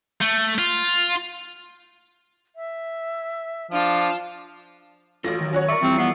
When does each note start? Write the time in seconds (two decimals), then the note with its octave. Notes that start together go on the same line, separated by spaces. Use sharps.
0.21 A3
0.59 F4
2.56 E5
3.71 F3 D4 F4 A5
5.24 A1 F4 F#4 A4 A#6
5.40 D#3 F#3
5.53 C#4 F#4 C#5
5.69 A#4 D5 E5 C#6 C#7
5.82 E3 F3 G3 C4
5.99 B3 C7